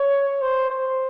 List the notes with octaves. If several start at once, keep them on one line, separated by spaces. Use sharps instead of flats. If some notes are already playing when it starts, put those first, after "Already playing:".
Already playing: C#5
C5
C5